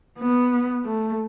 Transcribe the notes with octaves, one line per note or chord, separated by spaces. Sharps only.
B3
A3